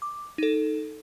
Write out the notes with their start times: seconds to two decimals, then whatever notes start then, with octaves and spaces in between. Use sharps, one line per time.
0.02 D6
0.38 D#4 A4